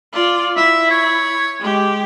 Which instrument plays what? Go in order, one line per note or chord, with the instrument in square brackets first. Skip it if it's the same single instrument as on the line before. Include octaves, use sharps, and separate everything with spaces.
[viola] F4 D5
[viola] E4 [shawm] E5
[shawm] C#5
[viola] G#3 G4